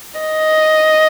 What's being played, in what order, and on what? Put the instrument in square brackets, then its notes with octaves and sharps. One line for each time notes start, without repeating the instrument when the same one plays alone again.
[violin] D#5